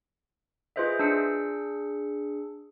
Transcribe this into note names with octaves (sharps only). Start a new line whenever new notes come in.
F4 G#4 B4 C5 D#5 E5
D4 G#4 E6 C#7